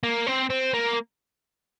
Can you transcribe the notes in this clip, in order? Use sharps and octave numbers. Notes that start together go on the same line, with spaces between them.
A#3
C4
C4
A#3